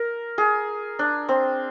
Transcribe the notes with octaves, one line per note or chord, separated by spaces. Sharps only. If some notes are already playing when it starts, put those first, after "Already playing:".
Already playing: A#4
G#4
D4
C4